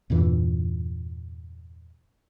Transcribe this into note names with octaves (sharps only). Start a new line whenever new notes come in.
E2 G2 A#2 E3